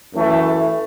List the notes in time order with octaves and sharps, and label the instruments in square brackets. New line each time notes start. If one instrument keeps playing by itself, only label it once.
[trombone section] F#2 E3 A3